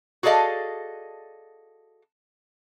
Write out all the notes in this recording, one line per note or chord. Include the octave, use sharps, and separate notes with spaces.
F#4 G#4 A4 D5 D#5 F5